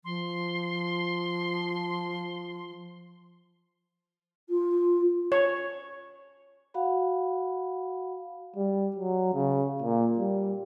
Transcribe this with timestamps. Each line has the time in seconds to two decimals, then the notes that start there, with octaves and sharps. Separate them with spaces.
0.05 F3 C6
4.49 F4
5.32 C#5
6.74 F#4 F5 F#5 B5
8.56 G3
8.96 F#3
9.34 C#3
9.82 A#2
10.19 G3